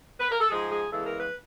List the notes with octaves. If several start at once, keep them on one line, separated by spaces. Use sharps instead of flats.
B4
A#4
A4
G#2 F3 G#3 G#4
G#4
E2 C#3 E3 G#3 A4
A#4
B4